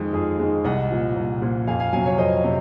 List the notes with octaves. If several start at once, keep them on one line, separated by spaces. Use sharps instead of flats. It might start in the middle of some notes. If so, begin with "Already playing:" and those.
Already playing: F2 D#3 G#3 D#4
F2 F4 G#4
D#3 G#3
C2 D#5 F#5
A#2 F3
C2
A#2 F3
F2 F5 G#5
F5 G#5
C3 F#3 F5 G#5
C#5 F5
F2 C5 D#5
C3